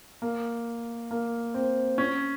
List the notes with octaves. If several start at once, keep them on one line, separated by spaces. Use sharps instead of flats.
A#3
A#3
C4
C#4